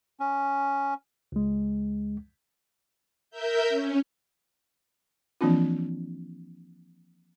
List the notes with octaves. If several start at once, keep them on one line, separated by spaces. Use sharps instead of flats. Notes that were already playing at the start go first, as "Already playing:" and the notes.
C#4
C#2 G#3
A#4 E5 G6
C#4
E3 F3 A#3 C4 D4 F4